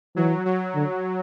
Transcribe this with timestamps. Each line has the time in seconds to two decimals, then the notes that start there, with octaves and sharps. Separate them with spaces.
0.16 E3 F#3
0.46 F#3
0.75 D3